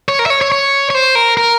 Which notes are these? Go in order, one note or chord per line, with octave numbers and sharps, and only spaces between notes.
C#5
A#4
E5
C#5
C#5
C#5
C#5
C5
A#4
A#4